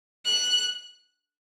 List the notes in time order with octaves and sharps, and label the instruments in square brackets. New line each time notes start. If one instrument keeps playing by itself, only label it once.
[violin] F#6